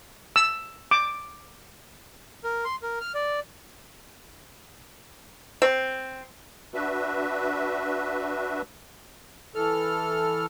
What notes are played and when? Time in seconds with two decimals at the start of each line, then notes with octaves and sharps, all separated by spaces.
0.36 E6
0.91 D6
2.44 A#4
2.65 C6
2.83 A#4
3.00 F6
3.15 D5
5.62 C4
6.74 D4 F#4 B4 E5
9.55 E3 A4 F6